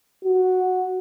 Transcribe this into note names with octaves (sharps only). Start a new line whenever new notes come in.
F#4